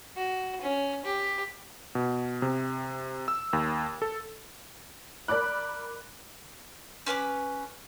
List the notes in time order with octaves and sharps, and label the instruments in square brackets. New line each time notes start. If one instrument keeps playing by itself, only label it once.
[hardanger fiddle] F#4
C#4
G4
[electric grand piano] B2
C3
E6
D#2
A4
[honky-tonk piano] A#4 D5 B5 D6 F#6
[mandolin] C#4 B4 C6 D6